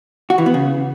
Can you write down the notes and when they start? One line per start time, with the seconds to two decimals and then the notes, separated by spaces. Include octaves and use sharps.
0.30 F#4
0.38 E3
0.46 B3
0.54 C#3